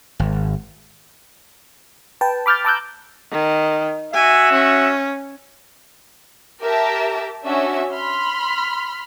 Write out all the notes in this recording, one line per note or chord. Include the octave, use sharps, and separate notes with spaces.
G#1
B4 G5 A5
B5 D6 F6 G6 A6
A5 A#5 D6 E6 F#6 G6
D#3
F#4 E5 G#5
C#4
G4 A#4 E5 A5 A#5
C#4 D4 F#4 E5
B5 C6 F6